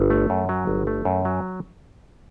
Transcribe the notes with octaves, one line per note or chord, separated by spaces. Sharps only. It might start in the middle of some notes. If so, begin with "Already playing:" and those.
Already playing: G1
A3
F#2
F#3
G1
A3
F#2
F#3